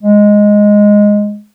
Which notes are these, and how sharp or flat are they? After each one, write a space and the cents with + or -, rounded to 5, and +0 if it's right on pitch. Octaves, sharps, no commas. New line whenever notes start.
G#3 -5